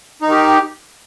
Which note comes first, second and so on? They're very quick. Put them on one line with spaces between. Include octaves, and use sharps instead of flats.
D#4 D#3 G4